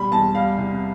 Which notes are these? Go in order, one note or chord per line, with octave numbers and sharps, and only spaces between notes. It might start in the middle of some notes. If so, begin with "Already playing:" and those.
Already playing: B2 G3 B5
E2 A5
G3 F5
C2